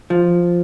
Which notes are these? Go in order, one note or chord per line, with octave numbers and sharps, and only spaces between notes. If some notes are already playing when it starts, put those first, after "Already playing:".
F3